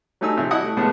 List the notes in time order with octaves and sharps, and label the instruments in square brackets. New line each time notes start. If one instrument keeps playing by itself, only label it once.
[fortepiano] F#3 G3 A3 D#4 G#5 E6
G#1 C3 F3 E5 E6
G3 E4 F#4 D#5 F#5 D#6
A3
A#1 A2 C3 G#3 B3 A5